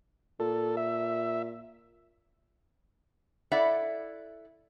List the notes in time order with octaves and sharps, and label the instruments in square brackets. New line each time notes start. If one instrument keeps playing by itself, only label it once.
[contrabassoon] A#2 [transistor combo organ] A4
[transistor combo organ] E5
[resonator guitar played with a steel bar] E4 A4 D5 E5 F#5